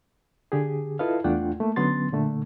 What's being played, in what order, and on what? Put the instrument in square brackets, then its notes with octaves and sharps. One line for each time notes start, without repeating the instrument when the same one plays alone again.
[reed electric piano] D3 G4 G#4
E4 F4 A4 B4 D#5 F5
E2 A3 D4 F4 F#5 G5
A3 A#3
D3 F#3 B3 C#4 C6 A6
A#2 D3 A3